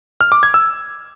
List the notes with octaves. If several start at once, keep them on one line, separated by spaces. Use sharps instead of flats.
F6
D6
G#6
E6